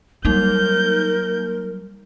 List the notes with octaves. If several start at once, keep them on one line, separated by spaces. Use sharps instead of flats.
F#3 G3 A#3 D#4 A#4 G6